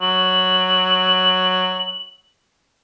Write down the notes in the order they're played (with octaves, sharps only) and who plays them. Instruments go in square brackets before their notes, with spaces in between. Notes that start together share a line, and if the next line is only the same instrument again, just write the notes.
[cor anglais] F#3 [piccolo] F#7